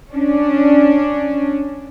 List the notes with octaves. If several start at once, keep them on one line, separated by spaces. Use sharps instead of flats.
C#4 D4